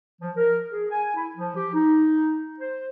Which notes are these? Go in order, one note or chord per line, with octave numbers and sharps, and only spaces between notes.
F3
A#4
G#4
G#5
E4
F3
G4
D#4
C5